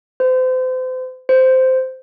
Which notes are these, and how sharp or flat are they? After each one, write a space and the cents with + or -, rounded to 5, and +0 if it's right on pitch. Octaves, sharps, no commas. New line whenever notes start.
C5 -35
C5 -10